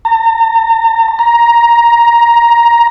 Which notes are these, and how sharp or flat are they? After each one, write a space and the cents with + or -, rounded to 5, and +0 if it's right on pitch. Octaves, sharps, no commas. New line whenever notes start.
A#5 -40
A#5 +10